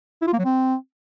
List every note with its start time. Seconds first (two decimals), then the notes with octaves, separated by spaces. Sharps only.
0.22 E4
0.27 F4
0.33 A#3
0.39 F#3
0.45 C4